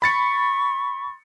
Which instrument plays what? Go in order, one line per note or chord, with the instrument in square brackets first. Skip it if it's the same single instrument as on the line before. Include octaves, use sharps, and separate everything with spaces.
[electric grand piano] B5 A6 C#7 [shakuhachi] C#6